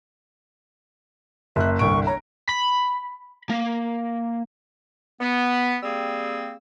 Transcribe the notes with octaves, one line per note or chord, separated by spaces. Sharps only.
F#1 E5 F#6
G1 C2 C#6 D7
C#5 A#5
B5
A#3
B3
G3 A#3 C4 G#4 E6